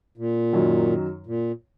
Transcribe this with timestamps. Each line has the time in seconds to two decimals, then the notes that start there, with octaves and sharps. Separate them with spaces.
0.18 A#2
0.53 F#2 D#3 F#3
1.26 A#2